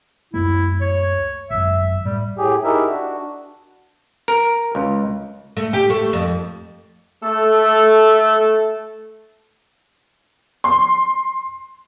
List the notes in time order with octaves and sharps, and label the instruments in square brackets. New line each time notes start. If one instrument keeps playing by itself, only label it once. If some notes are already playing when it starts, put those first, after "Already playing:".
[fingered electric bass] C#2 F#2 A3 [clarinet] E4
[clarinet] C#5
[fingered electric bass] G#1 F#2 [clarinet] E5
[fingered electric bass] A2 [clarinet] G3
[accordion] A2 G4 G#4
D#4 E4 G4 G#4 A#4 E5
D4 F#4
[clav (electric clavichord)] A#4
C#2
[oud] A3
G4
A3
F2
[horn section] A3 A4
[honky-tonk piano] C6